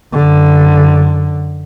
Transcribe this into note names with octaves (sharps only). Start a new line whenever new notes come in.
F#2 D3